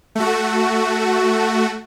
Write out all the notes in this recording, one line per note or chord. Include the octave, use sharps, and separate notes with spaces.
A3 F#4